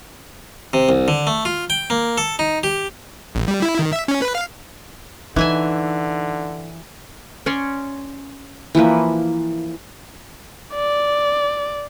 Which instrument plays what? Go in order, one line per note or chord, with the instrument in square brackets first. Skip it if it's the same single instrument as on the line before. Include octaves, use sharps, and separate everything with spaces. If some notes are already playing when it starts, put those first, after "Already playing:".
[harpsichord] C3
C2
D3
A3
F4
G5
A#3
A4
D#4
G4
[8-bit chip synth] A1
G3
E4
D#3
E5
C#4
B4
F5
[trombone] D3 [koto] E3 E5 G#5 [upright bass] D#4
[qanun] C#4 C#5 D5 C6
E3 F3 A#3 B4
[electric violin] D5